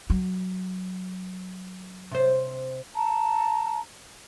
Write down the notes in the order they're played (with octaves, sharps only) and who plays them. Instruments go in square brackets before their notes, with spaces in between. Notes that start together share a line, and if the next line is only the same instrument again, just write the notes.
[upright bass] F#3
[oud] C3 C5
[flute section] A5 A#5